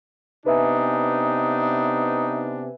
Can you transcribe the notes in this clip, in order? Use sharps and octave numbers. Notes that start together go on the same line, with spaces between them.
C3 B3 D4 D#4 B4 E5 G#5